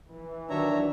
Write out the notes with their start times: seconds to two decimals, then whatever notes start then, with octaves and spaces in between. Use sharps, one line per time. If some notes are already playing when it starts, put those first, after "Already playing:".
0.13 E3
0.50 D#3 F#3 D4 C#5 E5 A#5